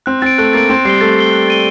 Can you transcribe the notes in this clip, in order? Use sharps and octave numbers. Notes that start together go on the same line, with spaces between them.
C4 F#6
C4 A6 D7
A3 F#6
A#3 A6 D7
C4 A6
G3 C7 G7
A3 A6
C7 G7
F#6
A6 D#7 G7